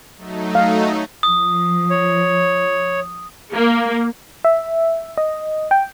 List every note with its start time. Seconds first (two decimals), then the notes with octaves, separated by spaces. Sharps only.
0.17 F#3 A3 D#4
0.55 F5
1.23 F3 D#6
1.90 C#5
3.54 A#3
4.45 E5
5.18 D#5
5.71 G5